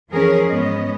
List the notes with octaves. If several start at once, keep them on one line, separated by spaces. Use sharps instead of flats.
E3 F3 C#4 G#4 A#4
G#2 B3 C#4 D#5